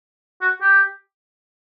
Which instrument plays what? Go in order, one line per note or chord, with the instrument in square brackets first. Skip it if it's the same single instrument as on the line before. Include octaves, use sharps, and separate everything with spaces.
[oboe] F#4
G4